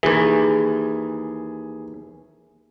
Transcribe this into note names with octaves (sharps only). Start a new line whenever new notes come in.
D#2 E3 G#4